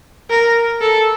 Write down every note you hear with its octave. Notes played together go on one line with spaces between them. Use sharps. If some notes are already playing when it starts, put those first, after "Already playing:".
A#4
A4